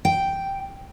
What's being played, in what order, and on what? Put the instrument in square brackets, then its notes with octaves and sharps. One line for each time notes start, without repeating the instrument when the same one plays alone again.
[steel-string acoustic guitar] G5